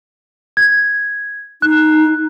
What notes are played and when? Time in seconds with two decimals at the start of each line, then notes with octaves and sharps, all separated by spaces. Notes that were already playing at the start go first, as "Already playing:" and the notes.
0.57 G#6
1.62 D#4 F#6